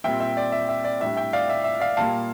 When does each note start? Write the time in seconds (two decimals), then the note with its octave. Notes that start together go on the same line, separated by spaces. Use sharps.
0.04 A#2 G3 C4 E5 G5
0.20 E5
0.37 D5
0.52 E5
0.69 E5
0.84 D5
1.00 A2 G3 D4 E5
1.17 E5 G5
1.33 D5 F5
1.49 E5
1.64 E5
1.80 D5 F5
1.97 A#2 G3 A#3 F5 A5